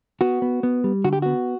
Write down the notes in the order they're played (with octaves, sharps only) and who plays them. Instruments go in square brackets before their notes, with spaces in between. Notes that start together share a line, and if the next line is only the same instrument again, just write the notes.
[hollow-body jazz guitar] B3 F#4
B3
B3
G3
D3 F#4
G4
B3 F#4